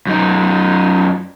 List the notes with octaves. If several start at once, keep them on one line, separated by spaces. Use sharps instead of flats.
F#2 D#4